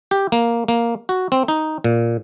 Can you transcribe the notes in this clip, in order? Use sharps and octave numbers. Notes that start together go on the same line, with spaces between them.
G4
A#3
A#3
F#4
C4
D#4
A#2